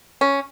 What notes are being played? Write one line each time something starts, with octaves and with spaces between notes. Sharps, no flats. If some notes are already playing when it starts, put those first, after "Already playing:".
C#4